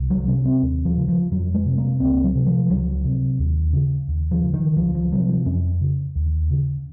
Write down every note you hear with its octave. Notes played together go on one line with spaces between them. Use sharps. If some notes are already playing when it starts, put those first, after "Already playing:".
Already playing: C2
F#3
C3 C#4
C4
D#2
F3
C#3
F3
F2 F#3
G#3
C3
A#3
C#2 C4
F#3
C3
F3
C#2 F#3
C3
D#2
C#3
D#2
F3
C#3
D#3
C#2 F3
F3
C3 F#3
F3
F2 C#4
C#3
D#2
C#3